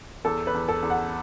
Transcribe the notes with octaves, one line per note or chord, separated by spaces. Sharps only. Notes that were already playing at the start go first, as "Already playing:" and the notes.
E2 A4
B4
E2
A4
E2
F#5